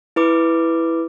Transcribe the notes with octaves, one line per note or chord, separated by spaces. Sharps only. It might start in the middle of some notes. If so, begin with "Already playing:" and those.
E4 B4 D6